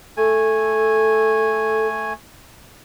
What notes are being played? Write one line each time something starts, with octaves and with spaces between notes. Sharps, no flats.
A3 A4 G#5